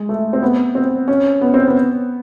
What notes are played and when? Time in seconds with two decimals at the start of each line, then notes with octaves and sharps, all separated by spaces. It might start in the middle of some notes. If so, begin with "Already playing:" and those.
Already playing: G#3
0.09 A3
0.33 C4
0.42 B3
0.75 C4
1.08 C#4
1.41 B3
1.54 C4
1.67 B3